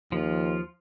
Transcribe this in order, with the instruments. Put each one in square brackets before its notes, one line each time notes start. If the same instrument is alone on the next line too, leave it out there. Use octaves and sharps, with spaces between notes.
[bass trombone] D#2 [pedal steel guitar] F3 F4